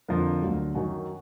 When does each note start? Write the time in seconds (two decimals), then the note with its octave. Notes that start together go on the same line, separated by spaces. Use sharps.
0.08 F2 D3 F3 A#4
0.42 D2 D3 F#3
0.75 F#2 D#3 F#3 F#4